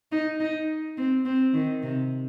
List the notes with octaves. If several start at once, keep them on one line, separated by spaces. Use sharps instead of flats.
D#4
D#4
C4
C4
D#3
C3